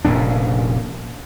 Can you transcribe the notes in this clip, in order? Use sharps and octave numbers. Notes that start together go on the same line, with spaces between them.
F1 A#2 C#3 D4